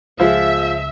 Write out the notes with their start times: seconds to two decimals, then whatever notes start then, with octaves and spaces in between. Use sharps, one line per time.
0.20 C#2 F3 G#3 F4 E5